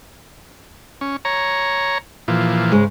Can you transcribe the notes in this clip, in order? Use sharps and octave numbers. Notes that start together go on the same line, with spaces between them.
C#4
C#5 A#5
A#2 E3 F3
G#2 C#3 G#3